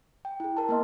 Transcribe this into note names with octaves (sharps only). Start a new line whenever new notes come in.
G5
E4 G#4
A#4 A5
A#3 B3 D#5 C6